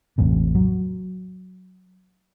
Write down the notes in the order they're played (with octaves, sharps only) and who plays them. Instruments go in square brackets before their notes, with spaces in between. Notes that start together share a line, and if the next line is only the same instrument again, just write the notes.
[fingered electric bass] A1 E2 A2 C3
F#3